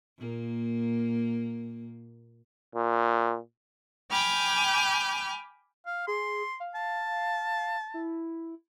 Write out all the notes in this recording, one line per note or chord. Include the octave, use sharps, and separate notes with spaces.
A#2 A#3
A#2
G5 G#5 B5 D6 F6 G6
F5
G#4 C6
F5
A5
E4